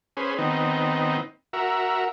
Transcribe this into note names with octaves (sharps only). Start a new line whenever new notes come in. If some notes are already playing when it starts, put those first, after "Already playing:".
C#4 G#4 B4 C5
D#3 B3 C4 D#4
F#4 A#4 E5